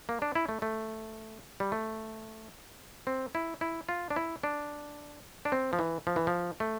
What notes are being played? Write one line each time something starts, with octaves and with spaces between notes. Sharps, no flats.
A#3
D4
E4
A3
A3
G3
A3
C4
E4
E4
F4
D4
E4
D4
D4
C4
F3
E3
F3
E3
F3
A3